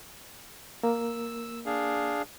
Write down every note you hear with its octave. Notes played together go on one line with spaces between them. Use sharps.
A#3 A#4 E6
D4 G#4 F5